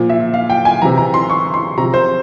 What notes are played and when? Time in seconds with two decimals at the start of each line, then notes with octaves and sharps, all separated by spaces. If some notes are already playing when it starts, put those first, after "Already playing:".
Already playing: A#2 F3
0.10 E5
0.34 F5
0.50 G5
0.65 G#5
0.82 C3 E3 A#5
0.98 A#5
1.14 C6
1.30 C#6
1.54 C6
1.77 C3 F3 A#5
1.94 C5